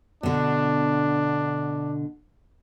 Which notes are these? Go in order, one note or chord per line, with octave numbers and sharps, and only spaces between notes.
B2 D3 D4